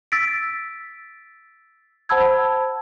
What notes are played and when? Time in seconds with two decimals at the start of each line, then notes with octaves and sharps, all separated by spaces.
0.12 E6 A6 B6 D7
2.09 C5 F#5 A5 B5 E6 G#6